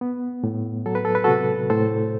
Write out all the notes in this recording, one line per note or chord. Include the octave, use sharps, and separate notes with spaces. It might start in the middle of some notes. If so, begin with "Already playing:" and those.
B3
A2
F#3 A4
B4
A4
B4
C3 F#4 A4
A2 A4 C5